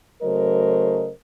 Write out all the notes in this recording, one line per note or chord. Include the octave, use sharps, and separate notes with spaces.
C#3 F#3 A3 A#4 C5 D#5